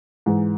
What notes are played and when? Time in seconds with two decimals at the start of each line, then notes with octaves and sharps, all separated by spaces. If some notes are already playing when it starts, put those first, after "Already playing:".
0.26 G#2 E3